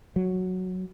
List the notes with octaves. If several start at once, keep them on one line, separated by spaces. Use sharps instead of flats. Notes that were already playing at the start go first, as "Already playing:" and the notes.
F#3